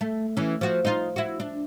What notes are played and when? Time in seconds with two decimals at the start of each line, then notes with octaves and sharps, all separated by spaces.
0.01 A3
0.37 E3 C#4
0.61 F3 F#4
0.85 D#4 F4
1.16 E4 F#4
1.40 D4